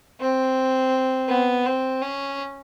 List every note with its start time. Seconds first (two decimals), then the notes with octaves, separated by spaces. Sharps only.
0.20 C4
1.28 B3
1.66 C4
2.02 C#4